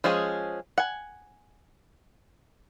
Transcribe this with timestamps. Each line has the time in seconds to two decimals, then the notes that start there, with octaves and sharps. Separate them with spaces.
0.04 F3 G#3 C#4 G#4
0.78 F#5 G#5